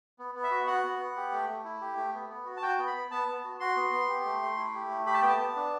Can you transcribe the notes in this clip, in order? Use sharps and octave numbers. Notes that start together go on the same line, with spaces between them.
B3
B3
E5
F#4
F#4 F#5
B3
B3
G4
A3
A3
E4
G4
A3
B3
B3
F#4
A5
F#4 G5
B3
B5
B3
B3 A5
B3
F#4
F#4 C6
B3
B3
G4
A3
A3
E4
G4
A3
G4 B5
A5
B3 G5
A5
B3
D4